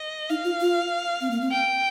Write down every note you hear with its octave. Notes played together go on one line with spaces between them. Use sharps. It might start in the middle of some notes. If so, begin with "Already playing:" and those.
Already playing: D#5
D#4 F5
F4
F4
C4
A#3
C4
G5